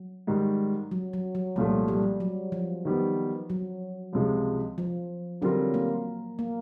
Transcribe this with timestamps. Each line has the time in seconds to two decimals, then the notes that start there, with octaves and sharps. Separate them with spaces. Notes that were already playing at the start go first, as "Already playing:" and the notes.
Already playing: F#3
0.27 G#2 D#3 G3
0.91 F#3
1.13 F#3
1.35 F#3
1.56 C2 A#2 F3 G3 A3
1.88 G3
2.20 F#3
2.52 F3
2.85 D#3 G3 B3
3.50 F#3
4.13 C#2 C3 F3 G#3
4.78 F3
5.41 D3 F#3 G3 C4 F4 A#4
5.74 A#3
6.39 A#3